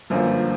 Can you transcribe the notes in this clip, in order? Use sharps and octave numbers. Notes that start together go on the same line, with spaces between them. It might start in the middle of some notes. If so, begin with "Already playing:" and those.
G1 F#2 D3 F3 A#3